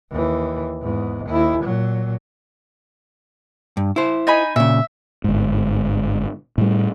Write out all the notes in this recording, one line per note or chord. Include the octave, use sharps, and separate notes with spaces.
D#2 E3
E2 G#2
D#2 E4
A#2 F#3
G2
E4 C5
D#4 G#5 B5
A#2 C#3 E5
G1 G#2
A2 G3